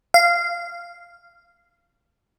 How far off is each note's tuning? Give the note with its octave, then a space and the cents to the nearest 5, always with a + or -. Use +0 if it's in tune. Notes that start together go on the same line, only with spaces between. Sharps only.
F5 -15